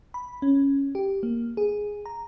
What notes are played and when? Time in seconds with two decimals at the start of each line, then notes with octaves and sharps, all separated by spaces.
0.14 B5
0.42 C#4
0.95 G4
1.23 A#3
1.57 G#4
2.06 A#5